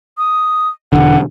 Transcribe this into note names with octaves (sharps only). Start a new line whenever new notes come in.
D#6
E1 A#1 D3 F#5